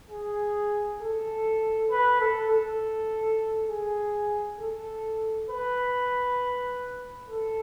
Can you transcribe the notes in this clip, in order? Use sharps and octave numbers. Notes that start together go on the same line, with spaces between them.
G#4
A4
B4
A4
A4
G#4
A4
B4
A4